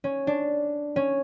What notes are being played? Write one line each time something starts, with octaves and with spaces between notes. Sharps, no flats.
C#4
D4
C#4